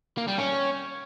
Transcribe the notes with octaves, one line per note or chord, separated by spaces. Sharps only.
A#3
G3
C#4